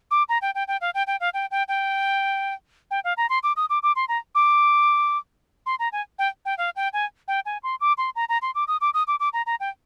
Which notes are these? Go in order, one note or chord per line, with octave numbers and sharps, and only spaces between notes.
D6
A#5
G5
G5
G5
F5
G5
G5
F5
G5
G5
G5
G5
F5
A#5
C6
D6
D#6
D6
D6
C6
A#5
D6
C6
A#5
G#5
G5
G5
F5
G5
G#5
G5
G#5
C6
D6
C6
A#5
A#5
C6
D6
D#6
D6
D#6
D6
D6
A#5
A#5
G5